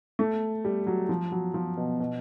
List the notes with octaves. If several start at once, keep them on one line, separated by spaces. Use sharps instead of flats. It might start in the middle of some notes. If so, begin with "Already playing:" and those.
A3
G3
F#3
F3
F#3
F3
B2
B2